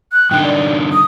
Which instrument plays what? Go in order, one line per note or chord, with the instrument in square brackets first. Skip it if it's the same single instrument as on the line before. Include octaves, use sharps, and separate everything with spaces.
[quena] F#6
[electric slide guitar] G2 D3 D#4 [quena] G5
[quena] D5
D#6